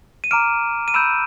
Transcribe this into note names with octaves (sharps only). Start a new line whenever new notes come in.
D#7
A#5 D6 F6 D7 E7
D#7
B5 E6 G6 D7 E7